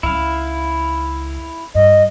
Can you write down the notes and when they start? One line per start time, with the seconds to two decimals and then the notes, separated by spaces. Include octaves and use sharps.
0.03 C#2 C#4 D#4 E4 F5
1.75 G2 D#5